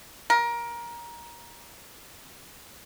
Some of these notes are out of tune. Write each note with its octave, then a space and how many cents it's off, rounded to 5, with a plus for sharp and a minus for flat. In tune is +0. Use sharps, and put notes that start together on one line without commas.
A#4 +20